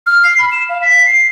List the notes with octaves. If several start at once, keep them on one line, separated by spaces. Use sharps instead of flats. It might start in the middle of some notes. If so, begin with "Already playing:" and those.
F6
C7
B5
E7
F5
B6
C7